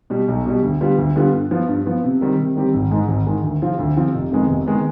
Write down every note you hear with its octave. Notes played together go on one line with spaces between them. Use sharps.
B2 G3
B1
B2 G3
D2
D3 G3 B3 F4
D2
D3 G3 B3 F4
G2
F3 B3
G2
F3 B3
C3
D#3 G3 C4 G4
C3
D#3 G3 C4 G4
G#1
G#2 D#3 G#3
G#1
G#2 D#3 G#3
D2
C3 F3 C4 F4
D2
C3 F3 C4 F4
F1
F2 D#3 G#3 B3
F1
D#3 G#3 B3